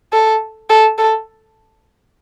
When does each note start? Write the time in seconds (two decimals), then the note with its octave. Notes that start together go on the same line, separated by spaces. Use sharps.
0.13 A4
0.70 A4
0.98 A4